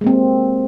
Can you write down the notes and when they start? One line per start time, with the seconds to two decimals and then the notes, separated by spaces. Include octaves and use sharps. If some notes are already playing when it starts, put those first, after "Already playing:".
0.01 G#3
0.04 A#3
0.07 C4